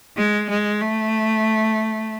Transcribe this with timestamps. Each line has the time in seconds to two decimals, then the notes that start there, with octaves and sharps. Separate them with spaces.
0.17 G#3
0.49 G#3
0.81 A3